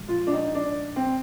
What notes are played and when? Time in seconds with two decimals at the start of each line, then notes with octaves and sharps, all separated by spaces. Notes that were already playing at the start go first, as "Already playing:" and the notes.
Already playing: A#2 F3 G#3
0.08 F4
0.27 D4
0.32 D#4
0.55 D4
0.96 C4